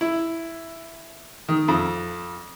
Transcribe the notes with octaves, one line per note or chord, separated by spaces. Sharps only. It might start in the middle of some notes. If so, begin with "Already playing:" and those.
E4
D#3
F2